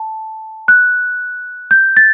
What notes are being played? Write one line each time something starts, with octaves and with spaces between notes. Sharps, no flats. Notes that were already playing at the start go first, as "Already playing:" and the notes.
Already playing: A5
F#6
G6
A6